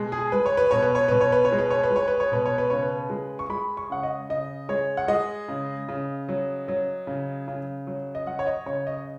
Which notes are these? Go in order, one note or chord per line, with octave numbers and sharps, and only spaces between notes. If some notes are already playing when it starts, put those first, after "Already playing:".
Already playing: B2 G#3
G#4
G#3 B4
C#5
B4
B2 C#5
B4
C#5
B2 B4
C#5
B4
C#5
G#3
B4
C#5
B4
G#3
C#5
B4
C#5
B2 B4
C#5
B4
C#3 C#5
B4
G#3
C#6
G#3 B5
C#6
C#3 F#5
D#5
C#3 D#5
G#3 C#5
F#5
G#3 D#5
C#3
C#3
F#3
F#3
C#3
C#3
F#3
D#5
F#3 F#5
C#5
D#5
C#3 C#5
D#5